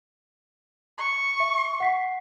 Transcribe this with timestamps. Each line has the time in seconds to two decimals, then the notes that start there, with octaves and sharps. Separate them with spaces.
0.98 C#6
1.40 E5
1.80 F#5 B6 C7